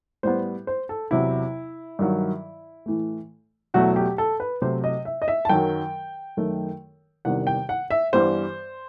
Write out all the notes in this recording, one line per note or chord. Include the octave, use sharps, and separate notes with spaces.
A2 G3 B3 C5
C5
A4
E2 C3 F#3 E4
G2 D#3 F#3
A2 E3 A3
E2 B2 F#3 A3 F#4
G4
A4
B4
C3 F#3 A3 C5
D#5
E5
D#5
E5
A5
F#2 D#3 F#3 G5
F#2 D#3 A3
E2 C3 D#3 G3 F#5
G5
F#5
E5
G2 E3 G3 B3 C5